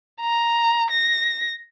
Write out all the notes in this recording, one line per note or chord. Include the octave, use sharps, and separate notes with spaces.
A#5
A#6